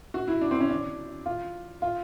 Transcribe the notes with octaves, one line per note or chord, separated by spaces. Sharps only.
F#4
E4
D4
C4
C#4
D4
F4
F4